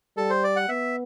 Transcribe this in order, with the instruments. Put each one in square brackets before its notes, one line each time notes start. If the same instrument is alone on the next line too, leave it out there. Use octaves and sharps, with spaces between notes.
[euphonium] G3 [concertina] A4
[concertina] C5
D5
F#5
[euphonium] B3 [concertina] E5